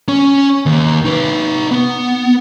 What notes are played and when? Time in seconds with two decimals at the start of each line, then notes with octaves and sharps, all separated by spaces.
0.08 C#4 G#5
0.66 D#2
1.05 D#4 B4
1.71 B3